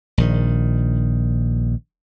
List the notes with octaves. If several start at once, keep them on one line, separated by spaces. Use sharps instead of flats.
A#1 D#3